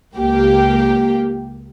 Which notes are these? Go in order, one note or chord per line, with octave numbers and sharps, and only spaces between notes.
C#2 A#3 G4